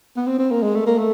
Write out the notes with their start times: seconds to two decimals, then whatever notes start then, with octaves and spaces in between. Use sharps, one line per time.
0.16 B3
0.27 C4
0.38 C4
0.51 A#3
0.63 G#3
0.75 A3
0.86 A#3
0.98 A3